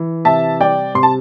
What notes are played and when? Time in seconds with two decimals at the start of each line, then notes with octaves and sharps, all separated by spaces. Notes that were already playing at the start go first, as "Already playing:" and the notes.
Already playing: E3
0.25 C3 E5 A5
0.60 G3 D5 G5
0.94 C3 C6
1.03 A5